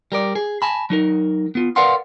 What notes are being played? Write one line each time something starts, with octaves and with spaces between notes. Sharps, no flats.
G3 A#4 D5
G#4
G#5 A5 B5
F#3 D#4 A#4
B3 F4
A#4 B4 D5 F5 F#5 C6